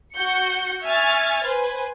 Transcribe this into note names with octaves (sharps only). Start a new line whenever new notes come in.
F#4 G6 C#7
E5 G#5 C#6 F6 G#6 A6
B4 C5 G#5